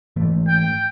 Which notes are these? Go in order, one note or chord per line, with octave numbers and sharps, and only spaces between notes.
G#2 E3 A3
G5